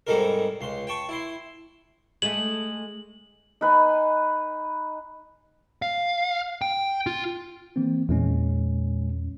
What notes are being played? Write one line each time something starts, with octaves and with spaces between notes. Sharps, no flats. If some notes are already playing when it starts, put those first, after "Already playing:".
G#2 G3 C4 D#4 A4 A#4
C#2 C6
G5 A5 C#6
E4 C6
G#3 A3 F#7
D#4 B4 G#5
F5
G5
F4
E3 A#3 C4
E2 A#2 G#3 C#4